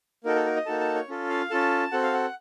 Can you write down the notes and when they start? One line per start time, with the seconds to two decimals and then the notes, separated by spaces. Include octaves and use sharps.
0.24 A#3 D#4 F#4 A4 A#4
0.35 A4
0.46 A#4
0.56 D#5
0.66 A#3 D#4 F#4 A4 A5
0.80 A5
0.95 C#5
1.08 C#4 F4 A4
1.30 F5
1.50 C#4 F4 A4 A5
1.92 C4 F#4 A4 F#5
2.03 F5
2.13 F#5